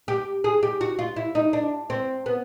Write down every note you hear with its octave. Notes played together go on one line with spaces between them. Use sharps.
G4
G#4
G4
F#4
F4
E4
D#4
D4
C4
B3